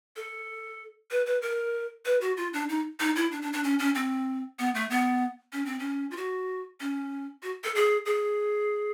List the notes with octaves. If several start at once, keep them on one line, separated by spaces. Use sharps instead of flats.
A4
B4
B4
A#4
B4
F#4
F4
D4
D#4
D#4
E4
D4
D4
D4
C#4
C#4
C4
B3
A3
B3
C#4
C4
C#4
F4
F#4
C#4
F#4
A4
G#4
G#4